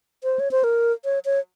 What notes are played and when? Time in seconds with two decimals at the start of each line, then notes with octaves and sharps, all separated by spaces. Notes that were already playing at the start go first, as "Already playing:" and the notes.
0.24 C5
0.40 C#5
0.51 C5
0.64 A#4
1.05 C#5
1.25 C#5